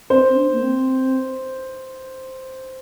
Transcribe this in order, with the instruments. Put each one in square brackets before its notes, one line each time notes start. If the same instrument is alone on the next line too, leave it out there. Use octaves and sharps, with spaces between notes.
[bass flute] C4 [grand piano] C5
[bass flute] C4
D4
A#3
C4